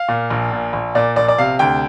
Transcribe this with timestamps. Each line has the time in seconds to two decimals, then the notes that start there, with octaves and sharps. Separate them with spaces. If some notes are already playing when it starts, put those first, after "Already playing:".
Already playing: F5
0.08 A#2
0.30 A#1
0.52 A#2
0.73 A#1
0.95 A#2 D5
1.16 A#1 D5
1.28 D5
1.38 C3 F5
1.59 D2 G5